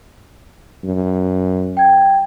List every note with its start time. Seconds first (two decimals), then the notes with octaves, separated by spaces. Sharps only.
0.84 F#2
1.77 G5 G#6